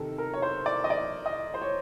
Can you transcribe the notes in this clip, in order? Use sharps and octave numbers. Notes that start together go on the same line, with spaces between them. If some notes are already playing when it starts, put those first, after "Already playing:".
Already playing: C3 D#3 A4
A#4
C#5
C5
D5
D#5
D5
D#5
C5
C#5